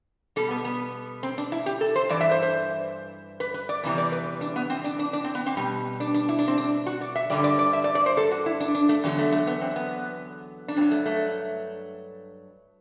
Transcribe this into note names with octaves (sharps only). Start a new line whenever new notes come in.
B2 G3 A4
B3
B3
C4
D4
E4
G4
A4
C5
G2 E3 D5
E5
C5
C5
B4
B4
D5
E2 C3 E3 G3
D5
B4
D4
B3
C4
D4
D4
D4
C4
B3
C4
B2 G3
D4
D4
E4
D4
C4
D4
F#4
D5
E5
G2 D3 G3 D5
D5
D5
E5
D5
D5
C5
A4
F#4
E4
D4
D4
A3
E2 D3 F#3 G3
A3
A3
B3
C4
B3
D4
G2 F#3 C4
A3
A3